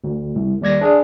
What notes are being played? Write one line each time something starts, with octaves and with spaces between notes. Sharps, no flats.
D2
C2
D#2 G3 D5 G#6 A#6
D4 G#4